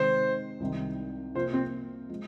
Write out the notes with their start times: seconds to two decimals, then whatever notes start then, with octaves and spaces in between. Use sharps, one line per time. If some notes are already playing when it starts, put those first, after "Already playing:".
Already playing: C3 D#3 G#3 C5
0.60 C2 C3 D#3
1.35 C3 F3 A#3 F4 C5
1.53 C4
2.09 F3 G#3 F4